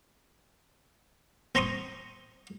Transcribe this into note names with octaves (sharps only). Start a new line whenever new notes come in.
C4 A#5 C6 C#6 D#6